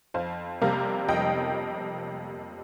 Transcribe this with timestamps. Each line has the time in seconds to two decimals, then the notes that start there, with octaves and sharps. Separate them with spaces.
0.14 F2 C5 F5
0.62 C3 G3 A#3 F5 A#5
1.09 F2 D#5 G5